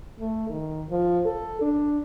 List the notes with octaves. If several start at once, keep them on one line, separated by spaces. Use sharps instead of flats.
A3
D#3
F3
A4
D4